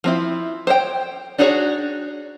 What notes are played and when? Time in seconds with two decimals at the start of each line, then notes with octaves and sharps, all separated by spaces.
0.04 F3 C4 E4
0.67 C5 C#5 G5
1.38 D4 D#4 F#4 G#4 C#5